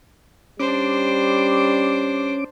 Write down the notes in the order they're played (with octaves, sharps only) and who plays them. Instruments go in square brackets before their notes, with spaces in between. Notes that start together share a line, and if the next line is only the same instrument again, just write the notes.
[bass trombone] G3 [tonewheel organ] C#4 D6 [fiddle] D4 C5